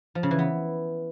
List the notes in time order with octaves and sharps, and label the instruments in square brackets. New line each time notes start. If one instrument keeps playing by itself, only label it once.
[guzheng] F3
C#3
E3
B3